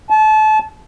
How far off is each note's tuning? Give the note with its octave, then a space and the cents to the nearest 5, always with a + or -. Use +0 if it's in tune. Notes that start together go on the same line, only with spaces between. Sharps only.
A5 -30